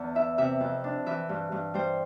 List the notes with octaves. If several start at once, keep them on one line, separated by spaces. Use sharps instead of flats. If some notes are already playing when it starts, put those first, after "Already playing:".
Already playing: E2 D3
E4 E5
C3 E5
F2
D4
E3 E5
G2
G2
G3 C5